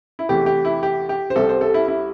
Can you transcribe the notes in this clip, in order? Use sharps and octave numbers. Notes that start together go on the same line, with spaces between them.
E4
E2 C3 E3 A3 G4
G4
E4
G4
G4
C5
C2 C3 G3 A4
C5
A4
E4
E4